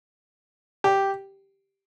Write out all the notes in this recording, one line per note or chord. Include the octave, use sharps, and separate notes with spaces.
G4